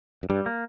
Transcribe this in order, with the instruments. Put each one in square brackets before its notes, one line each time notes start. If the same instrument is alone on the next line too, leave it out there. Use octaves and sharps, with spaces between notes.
[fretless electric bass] F#2
[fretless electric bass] G2 [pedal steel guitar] G3
[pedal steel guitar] A#3